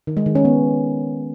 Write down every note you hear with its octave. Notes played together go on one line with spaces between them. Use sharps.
D#3
G#3
D#3
C#4
B3